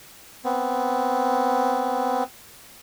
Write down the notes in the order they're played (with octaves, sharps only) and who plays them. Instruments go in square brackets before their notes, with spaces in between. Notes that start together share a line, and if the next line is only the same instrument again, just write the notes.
[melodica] B3 C4